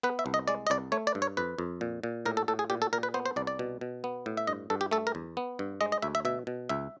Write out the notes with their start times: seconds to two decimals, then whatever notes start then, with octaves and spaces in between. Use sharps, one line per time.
0.03 B3 B4
0.19 E5
0.26 C2
0.34 D#5
0.48 G#3 D5
0.67 D#5
0.70 C2 D5
0.92 A3 C#5
1.07 D5
1.15 G2
1.22 C#5
1.37 F2 B4
1.58 F2
1.81 A#2
2.03 A#2
2.25 A2 A#4
2.37 A4
2.48 A2 A4
2.59 G#4
2.70 A#2 G4
2.82 A4
2.93 A#2 A#4
3.03 B4
3.14 B3 C5
3.26 C5
3.36 C2 D5
3.47 D5
3.59 B2
3.81 B2
4.04 B3
4.26 A2
4.37 E5
4.47 G2 D#5
4.70 G2 A4
4.81 G4
4.91 A3 A4
5.07 A#4
5.15 E2
5.37 B3
5.59 G2
5.81 G#3 D#5
5.92 D#5
6.02 D2 E5
6.15 E5
6.25 B2 E5
6.47 B2
6.69 C#2 E5